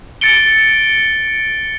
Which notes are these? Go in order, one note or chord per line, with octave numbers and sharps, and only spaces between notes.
A6 C#7 D7 G7